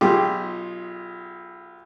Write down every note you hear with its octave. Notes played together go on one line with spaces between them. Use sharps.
B1 F4 G4 G#4 D6